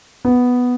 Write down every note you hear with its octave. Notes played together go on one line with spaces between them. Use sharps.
B3